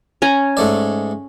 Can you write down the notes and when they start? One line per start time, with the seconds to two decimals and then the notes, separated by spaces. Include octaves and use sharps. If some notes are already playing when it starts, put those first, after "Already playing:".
0.22 C#4 G#5 A#5
0.57 G#2 A3 D5